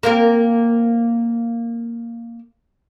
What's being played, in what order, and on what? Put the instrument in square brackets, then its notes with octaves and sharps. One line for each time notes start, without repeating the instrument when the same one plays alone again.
[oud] A#3 C4 A#4